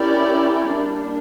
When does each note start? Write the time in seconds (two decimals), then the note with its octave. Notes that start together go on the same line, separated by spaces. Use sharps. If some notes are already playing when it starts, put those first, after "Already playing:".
Already playing: C#4 E4 G4 A#4 D5
0.74 G3 A#3 D4